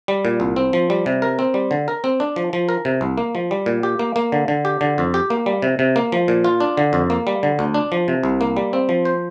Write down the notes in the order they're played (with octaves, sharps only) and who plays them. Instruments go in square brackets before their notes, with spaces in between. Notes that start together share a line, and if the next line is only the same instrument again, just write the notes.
[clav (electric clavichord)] G3
A#2
C2
C4
F3
G3
C3
A#4
C4
G3
D3
A#4
C4
D4
F3
F3
A#4
C3
C2
A#3
F3
G3
A#2
G4
A#3
A#3
D3
D3
G4
D3
F2
G4
A#3
G3
C3
C3
A#3
F3
A#2
F4
D4
D3
F2
A#3
G3
D3
D2
D4
F3
C3
C2
A#3
G3
C4
F3
C5